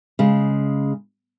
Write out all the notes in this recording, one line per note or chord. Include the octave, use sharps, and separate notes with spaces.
C#3 G#3